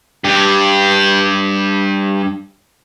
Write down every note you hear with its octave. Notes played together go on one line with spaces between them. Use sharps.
G2 G4